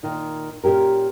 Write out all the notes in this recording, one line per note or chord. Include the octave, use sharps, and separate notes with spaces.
A#2 D#3 D#4
A#2 C#4 G4 A#4